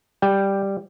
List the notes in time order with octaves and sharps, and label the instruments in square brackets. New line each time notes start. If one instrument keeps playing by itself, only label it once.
[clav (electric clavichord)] G3 G5